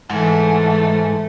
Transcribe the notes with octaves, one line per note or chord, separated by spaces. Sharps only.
G#2 E3 A3